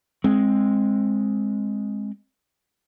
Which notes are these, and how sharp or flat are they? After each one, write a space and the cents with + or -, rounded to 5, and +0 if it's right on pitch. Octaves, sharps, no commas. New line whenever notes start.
G#3 +0 C4 +15